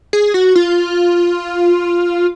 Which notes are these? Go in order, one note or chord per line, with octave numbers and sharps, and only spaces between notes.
G#4
F#4
F4